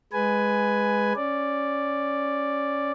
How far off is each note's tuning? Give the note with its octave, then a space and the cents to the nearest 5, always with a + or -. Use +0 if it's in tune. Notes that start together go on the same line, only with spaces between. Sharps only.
G#3 +0 B4 +5 G#5 +5
C#4 +0 D5 +0